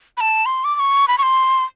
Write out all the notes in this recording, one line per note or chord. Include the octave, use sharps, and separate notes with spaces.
B5
A5
C6
D6
D6
C#6
B5
C#6
C6